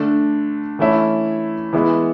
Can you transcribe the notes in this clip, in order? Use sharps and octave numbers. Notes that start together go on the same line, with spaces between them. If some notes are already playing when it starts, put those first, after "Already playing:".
Already playing: D3 A3 D4
E3 A3 C#4 E4
E3 G#3 B3 E4